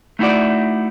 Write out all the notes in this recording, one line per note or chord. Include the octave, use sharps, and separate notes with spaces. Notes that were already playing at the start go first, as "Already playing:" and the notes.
A3 D#4 E4 F#4 D5